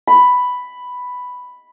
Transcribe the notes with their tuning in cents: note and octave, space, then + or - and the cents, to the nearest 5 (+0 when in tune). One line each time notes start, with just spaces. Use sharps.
B5 +5